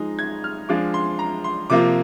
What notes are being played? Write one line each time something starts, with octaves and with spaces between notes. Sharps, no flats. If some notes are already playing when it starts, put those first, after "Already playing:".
Already playing: F3 G#3 D#4
G#6
F6
F3 G#3 D4 F4 D6
C6
A#5
C6
C3 F3 A#3 F4 D6